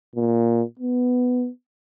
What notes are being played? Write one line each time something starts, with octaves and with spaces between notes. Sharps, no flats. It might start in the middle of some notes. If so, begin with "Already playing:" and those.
A#2
B3